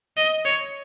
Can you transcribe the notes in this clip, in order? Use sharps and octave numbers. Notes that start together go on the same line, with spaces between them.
D#5
C#5